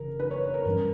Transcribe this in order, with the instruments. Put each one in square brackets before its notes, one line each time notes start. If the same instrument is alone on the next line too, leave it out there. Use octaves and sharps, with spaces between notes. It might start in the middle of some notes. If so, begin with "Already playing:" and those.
Already playing: [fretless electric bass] F#1 F#2 C#3 E3 [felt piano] A#4
[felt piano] B4
C#5
A#4
[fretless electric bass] G2 E3 G3 C#4 [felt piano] A#4